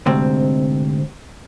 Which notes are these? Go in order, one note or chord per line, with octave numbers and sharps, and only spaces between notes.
D2 G#2 C3 C4